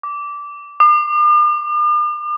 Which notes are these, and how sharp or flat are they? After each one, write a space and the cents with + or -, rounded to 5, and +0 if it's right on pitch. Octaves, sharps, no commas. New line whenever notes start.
D6 -15
D6 +45